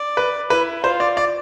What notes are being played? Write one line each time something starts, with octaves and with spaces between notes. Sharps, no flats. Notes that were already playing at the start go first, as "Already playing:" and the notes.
Already playing: D5
B4
E4 B4
F4 C5
D5
D5